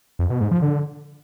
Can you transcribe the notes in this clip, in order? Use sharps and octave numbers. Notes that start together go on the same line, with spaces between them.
F2
B2
G#2
F3
D3